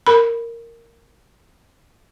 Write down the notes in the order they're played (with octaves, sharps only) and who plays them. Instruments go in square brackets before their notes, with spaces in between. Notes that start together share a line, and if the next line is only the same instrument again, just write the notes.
[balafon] A#4 B5